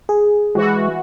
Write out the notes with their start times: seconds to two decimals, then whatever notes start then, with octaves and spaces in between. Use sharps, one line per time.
0.09 G#4
0.55 E3 G#3 F#4